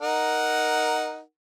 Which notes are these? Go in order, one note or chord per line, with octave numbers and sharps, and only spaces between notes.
D#4 A#4 F#5